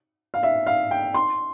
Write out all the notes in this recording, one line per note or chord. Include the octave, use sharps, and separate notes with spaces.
F5
E5
F5
G5
C6